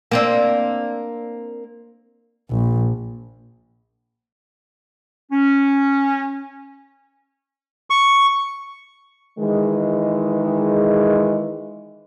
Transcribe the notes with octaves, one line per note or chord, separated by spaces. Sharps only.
A#3 C4 D4
A#1
C#4
C#6
D#3 E3 G#3